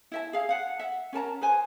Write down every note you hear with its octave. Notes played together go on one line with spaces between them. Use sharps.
E4 E5 A5
G#4 F5
F5 F#5 A5
E5 F#5
C#4 A#4 A5 A#5
G#4 B4 C5 G#5